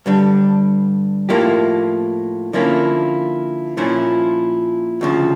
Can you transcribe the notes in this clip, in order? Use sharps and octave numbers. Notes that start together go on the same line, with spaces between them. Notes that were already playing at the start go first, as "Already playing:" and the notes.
G2 D3 G3
A2 F3 A#3 E4 G4
D3 F3 A#3 C#4 E4
A#2 F3 C#4 E4
D2 C#3 F3